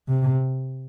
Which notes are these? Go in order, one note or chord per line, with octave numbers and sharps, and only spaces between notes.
C3